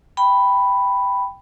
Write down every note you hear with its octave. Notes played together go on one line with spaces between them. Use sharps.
G5 B5